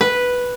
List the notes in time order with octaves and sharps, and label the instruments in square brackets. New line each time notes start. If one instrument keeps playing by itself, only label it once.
[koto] B4